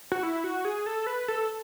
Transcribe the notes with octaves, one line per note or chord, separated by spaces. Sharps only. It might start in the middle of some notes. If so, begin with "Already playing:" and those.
F#4
E4
F#4
G#4
A4
B4
A4